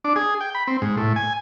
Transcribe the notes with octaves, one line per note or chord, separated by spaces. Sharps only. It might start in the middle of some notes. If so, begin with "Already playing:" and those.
D4
G#4
G5
B5
C4
G#2
A2
G#5